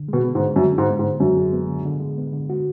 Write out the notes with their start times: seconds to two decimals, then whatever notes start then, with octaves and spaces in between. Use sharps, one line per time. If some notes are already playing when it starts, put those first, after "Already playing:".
Already playing: D3
0.08 B2 G#3
0.24 B3
0.35 G#2
0.40 D3
0.56 F#2 D3
0.73 G#3
0.78 G#2
0.89 B3
0.99 G#2
1.05 D3
1.20 F#2 D3
1.37 G#3
1.53 B3
1.69 D3
1.85 D3
2.00 G#3
2.18 B3
2.33 D3
2.50 F#4